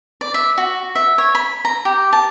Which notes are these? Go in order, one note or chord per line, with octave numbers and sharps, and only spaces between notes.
D5
E5
F#4
E5
C#5
B5
A#5
G4
A5